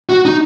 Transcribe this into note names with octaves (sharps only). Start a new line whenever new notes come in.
F#4
D#4